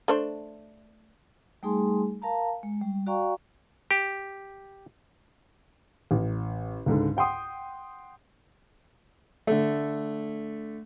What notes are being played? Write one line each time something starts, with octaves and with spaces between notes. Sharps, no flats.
A3 D4 C5
G3 A3 D#4 G#4 G#5 C6
A#4 F5 A5 A#5
G#3
G3
F#4 D5 F5 G5 A#5 C#6
G4
A1
C#2 G#2 D3
F#5 G5 C6 D#6
D3 A3